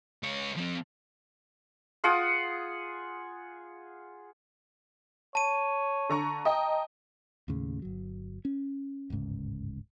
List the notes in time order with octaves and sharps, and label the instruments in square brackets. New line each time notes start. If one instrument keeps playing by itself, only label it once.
[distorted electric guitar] C#2 C#5
F3 C4
[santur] F4 G#4 F#5 D#6
[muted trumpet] C#5 [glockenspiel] A5 D#7
[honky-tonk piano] D3 A#5 C#6
[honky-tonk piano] D#5 G5 [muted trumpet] A#5
[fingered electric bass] D#2 A2 C#3
G1 F#3
C#4
D1 G1 G#2 C#3